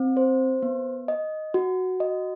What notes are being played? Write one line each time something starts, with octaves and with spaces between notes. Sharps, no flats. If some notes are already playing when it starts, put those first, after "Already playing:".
Already playing: C4
C5
B3
D#5
F#4
D#5